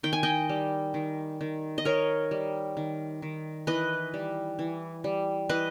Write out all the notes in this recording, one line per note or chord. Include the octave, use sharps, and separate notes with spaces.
D#3 G5
G#5
D#5 G5
G3
D#3
D#3
D#5
D#3 A#4 C#5
G3
D#3
D#3
E3 B4 D#5
G3
E3
G3
E3 B4 D#5